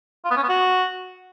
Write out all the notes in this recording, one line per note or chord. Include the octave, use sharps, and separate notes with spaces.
F4
B3
C#4
B3
F#4